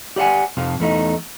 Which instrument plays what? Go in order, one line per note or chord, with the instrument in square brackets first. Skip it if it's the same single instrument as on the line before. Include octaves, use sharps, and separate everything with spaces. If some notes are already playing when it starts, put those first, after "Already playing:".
[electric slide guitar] G4 D5 D#5 F#5 G#5
F2 C3 F3
E2 A3 D#4